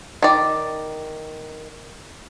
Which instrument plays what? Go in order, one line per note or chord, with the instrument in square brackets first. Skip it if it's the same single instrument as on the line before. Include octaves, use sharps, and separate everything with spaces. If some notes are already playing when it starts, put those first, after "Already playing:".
[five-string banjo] D#3 D5